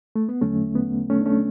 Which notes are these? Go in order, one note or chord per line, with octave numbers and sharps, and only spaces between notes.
A3
B3
E2 D3 F#3 A3 C#4
B3
A3 C#4
D4
A3 C#4